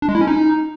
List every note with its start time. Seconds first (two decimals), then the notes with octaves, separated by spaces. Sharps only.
0.02 D4
0.09 G#3
0.15 E4
0.21 C#4
0.27 D#4